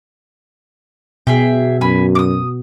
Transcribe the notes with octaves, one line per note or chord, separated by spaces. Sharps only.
B2 G#4 E5 G5
F#2 G#5 B5
D6 D#6